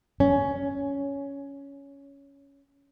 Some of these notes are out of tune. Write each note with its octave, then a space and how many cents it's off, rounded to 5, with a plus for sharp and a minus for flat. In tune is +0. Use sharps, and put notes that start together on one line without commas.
C#4 +10